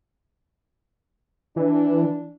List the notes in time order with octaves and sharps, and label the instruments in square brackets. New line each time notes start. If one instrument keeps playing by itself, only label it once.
[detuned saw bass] E3 [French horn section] D4